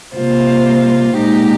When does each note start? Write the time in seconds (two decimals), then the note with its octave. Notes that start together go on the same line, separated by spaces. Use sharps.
0.15 C3 G3 A#3 F4 C5
1.15 A#2 G#3 D#4 G4